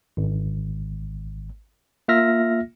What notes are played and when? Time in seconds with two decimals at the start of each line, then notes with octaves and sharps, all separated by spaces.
0.17 G#1
2.08 A#3 F4 E5 F6 A#6